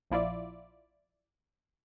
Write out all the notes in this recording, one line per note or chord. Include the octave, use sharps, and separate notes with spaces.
A#1 F3 E4 F4 D5